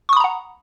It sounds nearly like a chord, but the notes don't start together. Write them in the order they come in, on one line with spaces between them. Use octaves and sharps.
C#6 D#6 B5 A#5 F#5